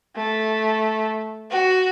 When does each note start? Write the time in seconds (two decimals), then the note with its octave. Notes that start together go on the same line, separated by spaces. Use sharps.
0.16 A3
1.51 F#4